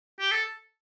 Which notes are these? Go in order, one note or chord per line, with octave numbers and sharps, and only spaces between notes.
G4
A4